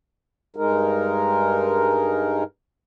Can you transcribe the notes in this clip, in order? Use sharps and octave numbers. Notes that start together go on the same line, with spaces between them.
G2 G#3 D#4 A#4